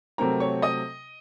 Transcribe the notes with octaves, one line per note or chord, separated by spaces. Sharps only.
C3 F#3 A3 C4 A#4 A#5
C#5 C#6
D#5 D#6